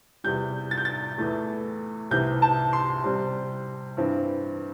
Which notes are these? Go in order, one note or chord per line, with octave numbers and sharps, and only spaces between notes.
E2 C3 G3 G6
A6
G6
A6
E2 E3 A3
C2 C3 E3 C4 G6
A5
C6
C3 G3 C4
G2 E3 C4